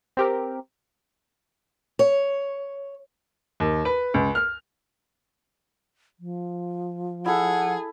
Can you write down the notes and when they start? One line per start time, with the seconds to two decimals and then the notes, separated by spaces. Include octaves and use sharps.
0.17 C4 G4 A#4
1.99 C#5
3.60 D#2
3.85 B4
4.14 C#2
4.35 F6
6.20 F3
7.26 E4 G#4 A4 F#5